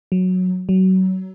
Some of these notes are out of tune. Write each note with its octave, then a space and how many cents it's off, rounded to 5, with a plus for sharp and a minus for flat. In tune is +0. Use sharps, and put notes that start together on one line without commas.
F#3 -10
F#3 +25